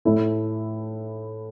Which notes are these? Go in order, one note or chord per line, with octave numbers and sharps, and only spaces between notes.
A2 A3 E4